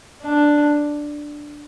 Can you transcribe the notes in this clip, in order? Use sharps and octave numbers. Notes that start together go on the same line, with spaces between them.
D4